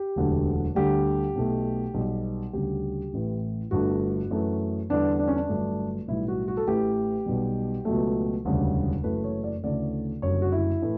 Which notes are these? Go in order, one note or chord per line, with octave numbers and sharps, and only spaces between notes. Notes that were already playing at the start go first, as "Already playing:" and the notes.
Already playing: G4
E1 D2 D3 F#3
D2 D3 G3 G4
B1 B2 A3
B1 B2 G3
D2 C#3 G3 G4
A1 A2 E3
G1 G2 D3 A3 F#4
F#2 E3 A3
E2 D3 G3 D4
D4
C#4
D4
G1 G2 F#3 A3
B1 A2 E3 G3 E4
F#4
F#4
A4
A1 A2 E3 A3 G4
B1 B2 G3
C#2 B2 F#3 A3
E1 D2 C#3 G3
F#1 F#2 E3 A3 B4
C#5
D5
D2 C#3 E3 A3 D5
F#1 F#2 D3 G3 C#5
F#4
E4
A2 E3 A3